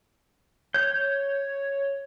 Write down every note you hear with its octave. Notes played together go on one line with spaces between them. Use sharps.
C#5 G6